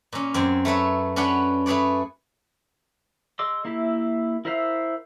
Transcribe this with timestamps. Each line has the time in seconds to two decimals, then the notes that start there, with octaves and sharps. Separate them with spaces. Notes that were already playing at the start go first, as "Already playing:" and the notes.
0.12 A#2 C#4
0.34 F#2 C4 G#5
0.65 A3 B4 C#5 E5
1.16 C#4 D4 B4 C#5 F#5
1.66 A3 G#4 B4 C#5 D5
3.39 G#4 D#5 C6 D6 E6
3.65 A#3 E4 G4 E5
4.45 E4 A#4 C5 E5 F5